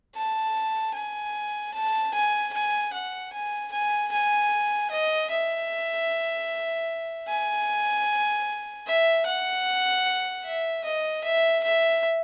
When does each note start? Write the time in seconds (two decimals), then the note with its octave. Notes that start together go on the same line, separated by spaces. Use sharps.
0.15 A5
0.95 G#5
1.74 A5
2.14 G#5
2.53 G#5
2.93 F#5
3.32 G#5
3.72 G#5
4.11 G#5
4.91 D#5
5.30 E5
7.28 G#5
8.87 E5
9.26 F#5
10.45 E5
10.85 D#5
11.24 E5
11.63 E5